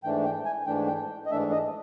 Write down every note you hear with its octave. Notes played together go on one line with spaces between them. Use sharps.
G#2 E3 A3 D4 G5
G5
G#5
G#2 E3 A3 D4 G5
G5
D#5
G#2 E3 A3 D4 E5
D#5